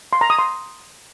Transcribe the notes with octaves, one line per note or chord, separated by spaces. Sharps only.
C6
A#5
D#6
C6